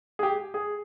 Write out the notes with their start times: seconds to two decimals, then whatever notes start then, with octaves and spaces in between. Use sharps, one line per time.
0.19 G#4
0.23 G4
0.54 G#4